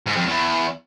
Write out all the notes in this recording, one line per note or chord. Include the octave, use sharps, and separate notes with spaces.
G#2
F2
E2